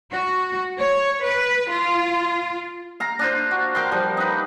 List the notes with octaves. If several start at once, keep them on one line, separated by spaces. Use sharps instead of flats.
F#4
C#5
B4
F4
F5 A#5
D4 F4 C5
F#4
A#4 F5 G5 C6
F3 G3
D#4 B4